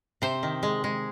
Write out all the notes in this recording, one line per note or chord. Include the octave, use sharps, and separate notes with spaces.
C3 C5
D#3
G#3
G#3